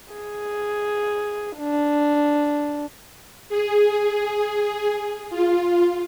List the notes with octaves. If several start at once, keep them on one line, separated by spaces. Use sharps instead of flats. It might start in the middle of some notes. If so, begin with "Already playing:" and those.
G#4
D4
G#4
F4